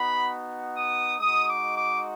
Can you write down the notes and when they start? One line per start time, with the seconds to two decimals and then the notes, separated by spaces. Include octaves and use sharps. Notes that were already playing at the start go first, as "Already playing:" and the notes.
Already playing: B3 D#4 F#4 B5
0.77 D#6
1.20 G#3 D#4 F#4 D#6
1.48 D6
1.76 D6